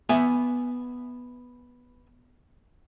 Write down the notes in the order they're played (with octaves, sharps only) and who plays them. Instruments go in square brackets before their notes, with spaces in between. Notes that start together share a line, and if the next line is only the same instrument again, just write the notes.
[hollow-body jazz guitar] B3 E5 G#5